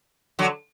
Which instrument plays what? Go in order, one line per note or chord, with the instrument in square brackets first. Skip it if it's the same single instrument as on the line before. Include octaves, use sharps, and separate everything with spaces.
[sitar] D3 F#3